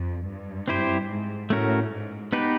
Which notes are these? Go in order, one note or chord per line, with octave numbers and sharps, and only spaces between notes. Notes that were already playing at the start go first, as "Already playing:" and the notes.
Already playing: F2
G2
C4 E4 G4 C5
G#2
A2 A3 C#4 F#4 A#4
G#2
B3 D#4 G4 B4